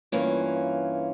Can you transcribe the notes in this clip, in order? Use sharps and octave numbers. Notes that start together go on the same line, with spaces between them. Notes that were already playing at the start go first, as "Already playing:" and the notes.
G2 E3 A#3 C#4 F4